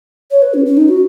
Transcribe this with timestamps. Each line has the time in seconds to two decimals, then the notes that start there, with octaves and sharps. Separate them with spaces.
0.31 C#5
0.42 B4
0.54 C#4
0.66 C#4
0.77 D#4
0.89 F#4